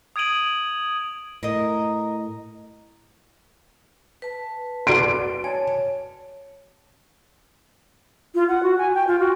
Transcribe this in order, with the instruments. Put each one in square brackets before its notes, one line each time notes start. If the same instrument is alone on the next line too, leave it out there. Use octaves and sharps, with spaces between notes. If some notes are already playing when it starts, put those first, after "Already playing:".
[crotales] D#6 G#6 D7 D#7 F#7
[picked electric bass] A2 [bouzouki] A#4 D#5
[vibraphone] B4 A5
[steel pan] F#4 D5 C6 [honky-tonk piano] D7
[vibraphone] C#5 [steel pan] G#5 A5
[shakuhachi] F4
F#5
F#4
G#5
G5
F4
F#4